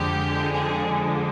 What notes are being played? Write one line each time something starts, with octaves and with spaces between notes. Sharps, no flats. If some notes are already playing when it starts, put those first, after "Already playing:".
Already playing: F2 D3 G#3 G4
G#4